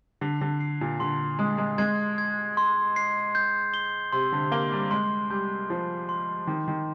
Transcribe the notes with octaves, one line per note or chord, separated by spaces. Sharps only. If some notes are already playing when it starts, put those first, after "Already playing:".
D3 C7
D3
C7
A#2
D3 C6
G#3 D#6
G#3
G#3 G#6
G#6
C6
C7
G6
G7
C3 C6
D3
A#3 G7
G3
G#3 C6
G3 G6
F3 C7
C6
D#3 D6
D#3